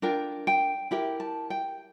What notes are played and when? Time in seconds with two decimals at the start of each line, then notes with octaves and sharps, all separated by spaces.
0.02 D4 F4 A#4 G5
0.47 G5
0.91 E4 G4 A#4 G5
1.20 A5
1.50 G5